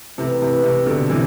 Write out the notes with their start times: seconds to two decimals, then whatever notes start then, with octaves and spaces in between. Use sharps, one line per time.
0.18 C3 E3 A3 E4 B4
0.42 C3
0.64 C3
0.86 B2 D3
1.10 C3 E3